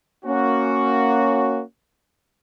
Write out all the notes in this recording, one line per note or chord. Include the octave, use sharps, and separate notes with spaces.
A#3 C#4 F#4